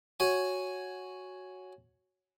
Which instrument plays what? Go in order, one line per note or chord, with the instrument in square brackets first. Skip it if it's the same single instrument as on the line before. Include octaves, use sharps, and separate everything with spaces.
[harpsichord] F#4 C#5 G#5